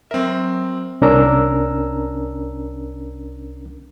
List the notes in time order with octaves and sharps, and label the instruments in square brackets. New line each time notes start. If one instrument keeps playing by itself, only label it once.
[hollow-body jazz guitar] F#3 E5 [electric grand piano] C4 A#4
[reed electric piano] C2 C#4 D4 A#4 A#5 E6